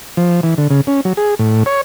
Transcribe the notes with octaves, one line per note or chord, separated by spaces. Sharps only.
F3
E3
D3
C#3
C#4
F#3
G#4
A2
C#5